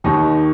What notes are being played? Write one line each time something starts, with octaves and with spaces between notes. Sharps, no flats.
D#2 D#3 D#4